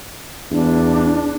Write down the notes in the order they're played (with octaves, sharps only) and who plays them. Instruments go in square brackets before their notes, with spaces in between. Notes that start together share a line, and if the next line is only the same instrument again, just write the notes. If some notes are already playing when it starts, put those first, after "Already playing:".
[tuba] E2 [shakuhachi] D4